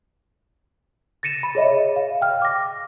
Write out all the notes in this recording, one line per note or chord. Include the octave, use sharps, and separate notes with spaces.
A6 A#6 C#7 D#7 E7
B5
G#4 C#5 D#5 E5
F5
G5 F6
D6 A#6